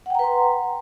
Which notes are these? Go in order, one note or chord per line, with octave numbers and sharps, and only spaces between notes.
B4 F#5 G5 A#5 C6